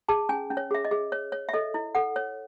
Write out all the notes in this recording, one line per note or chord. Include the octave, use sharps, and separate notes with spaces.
G#4 A5
C#4 G#5
C#4
C#5
G#4 E5
D#5
G#4
C#5
C#5
E5
A4 D#5
E4
A4 F#5
C#5